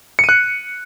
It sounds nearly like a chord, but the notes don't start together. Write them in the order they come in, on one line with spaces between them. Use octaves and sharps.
C#7 D#7 F#6